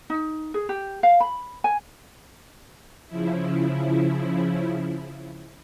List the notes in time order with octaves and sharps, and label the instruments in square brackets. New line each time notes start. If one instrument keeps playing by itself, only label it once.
[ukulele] D#4
G#4
G4
F5
B5
G#5
[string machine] C#3 F3 E4